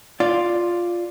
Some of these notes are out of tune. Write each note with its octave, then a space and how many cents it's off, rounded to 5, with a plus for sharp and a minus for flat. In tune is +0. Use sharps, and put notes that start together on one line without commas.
F4 +0 D5 +0